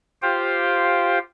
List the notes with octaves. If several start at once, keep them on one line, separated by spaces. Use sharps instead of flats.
F4 G4 C5 F5 G5